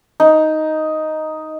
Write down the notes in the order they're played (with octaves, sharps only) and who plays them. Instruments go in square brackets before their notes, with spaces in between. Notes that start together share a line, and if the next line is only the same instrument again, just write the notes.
[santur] D#4